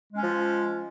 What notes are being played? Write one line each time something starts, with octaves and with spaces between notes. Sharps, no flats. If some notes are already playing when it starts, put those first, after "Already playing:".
F3 G#3 C#4